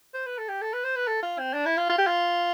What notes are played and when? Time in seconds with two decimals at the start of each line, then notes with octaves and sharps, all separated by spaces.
0.14 C5
0.27 B4
0.38 A4
0.49 G4
0.62 A4
0.73 B4
0.84 C5
0.96 B4
1.07 A4
1.23 F4
1.39 C4
1.54 D4
1.66 E4
1.77 F4
1.89 F4
1.98 G4
2.07 F4